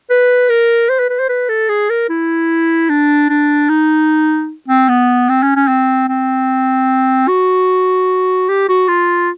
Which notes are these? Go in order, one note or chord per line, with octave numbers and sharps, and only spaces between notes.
B4
A#4
C5
B4
B4
C5
B4
A4
G#4
A#4
E4
D4
D4
D#4
C4
B3
C4
C#4
C#4
C4
C4
F#4
G4
F#4
F4